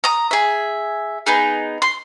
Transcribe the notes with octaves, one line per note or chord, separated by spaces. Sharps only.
A#5 D#6
G#4 E5
B3 D#4 G#4
C6